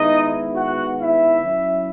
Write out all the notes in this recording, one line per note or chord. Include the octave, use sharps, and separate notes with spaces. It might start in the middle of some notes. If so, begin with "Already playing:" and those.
Already playing: D#3 G#3 B3 D#4 E4 D#5
F#4 F#5
E4 E5
F#3 C#4 E4